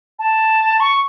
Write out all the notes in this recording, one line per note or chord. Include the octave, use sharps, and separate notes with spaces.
A5
C#6